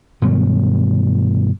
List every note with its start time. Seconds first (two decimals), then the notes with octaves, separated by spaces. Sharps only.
0.22 G2 B2 D#3 F#3